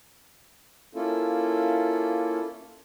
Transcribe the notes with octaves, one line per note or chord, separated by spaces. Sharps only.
A#3 C#4 E4 F4 A4